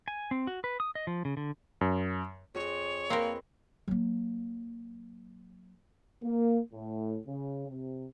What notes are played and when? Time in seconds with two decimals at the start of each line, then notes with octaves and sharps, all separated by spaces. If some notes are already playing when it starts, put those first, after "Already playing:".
0.08 G#5
0.31 C4
0.47 F#4
0.64 B4
0.80 D#6
0.95 D#5
1.07 F3
1.25 C#3
1.37 D3
1.81 F#2
2.55 F2 G#4 C#5
3.10 A#3 C4 A#4 B4 C6
3.88 F#3 A#3
6.23 A#3
6.72 A2
7.27 C#3
7.68 C3